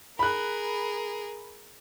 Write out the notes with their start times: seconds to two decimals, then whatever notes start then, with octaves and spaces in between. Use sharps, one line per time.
0.19 G#4 A#4 B5 F#6